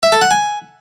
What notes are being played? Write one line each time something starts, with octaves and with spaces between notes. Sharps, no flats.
E5
A4
F#5
G#5